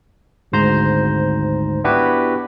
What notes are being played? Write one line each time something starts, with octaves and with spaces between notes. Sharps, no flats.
G#1 D2 G#2 C5 A#5 G6
B3 D4 E4 F#4 G4 B4